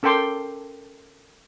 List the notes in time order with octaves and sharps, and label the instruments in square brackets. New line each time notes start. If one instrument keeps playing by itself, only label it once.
[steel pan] C#4 A4 A#4 G5 C6 D6